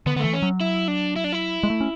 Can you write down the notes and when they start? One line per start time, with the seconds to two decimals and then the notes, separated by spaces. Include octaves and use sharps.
0.06 D3 B3
0.16 D3 B3
0.19 E3 A3
0.33 C#4
0.42 F#3
0.61 E4
0.88 D4
1.16 E4
1.24 D4
1.32 E4
1.63 G#3
1.70 A3
1.81 C#4